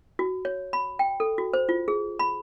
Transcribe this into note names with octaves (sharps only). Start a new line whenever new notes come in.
F#4
C#5
B5
G5
A4
F#4
C5
F4
G#4
B5